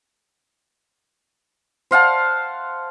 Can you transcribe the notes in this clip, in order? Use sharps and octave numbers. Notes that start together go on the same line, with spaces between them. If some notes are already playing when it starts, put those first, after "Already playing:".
C5 F5 F#5 A5